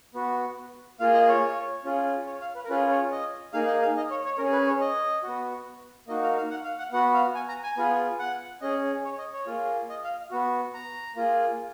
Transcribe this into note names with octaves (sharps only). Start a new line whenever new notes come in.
B3 F#4
A#3 F4 G#4 F5
D#5
C#5
C#4 F4 G#4
C#5
F5
B4
A#4
C#4 F4 G#4 B4
C#5
D#5
A#3 D#4 G#4 F5
D#5
F5
D#5
C#5
C#5
C#4 G#4 A#4
B4
C#5
D#5
B3 F#4
A#3 D#4 F#4 D#5
F5
F5
F#5
F5
F#5
B3 F#4 F#5
F5
G#5
A#5
G#5
B3 F4 G#4
F#5
C#4 G#4 D#5
C#5
D#5
C#5
A#3 F4 G#4
D#5
F5
B3 F#4
A#5
A#3 F4 G#4